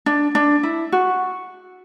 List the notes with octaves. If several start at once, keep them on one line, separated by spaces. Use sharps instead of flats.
D4
D4
E4
F#4